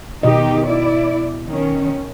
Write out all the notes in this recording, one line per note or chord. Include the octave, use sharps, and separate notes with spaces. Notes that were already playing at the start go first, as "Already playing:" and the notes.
B2 D#3 D#4 G4 D#5
E4 D5
D#3 C#4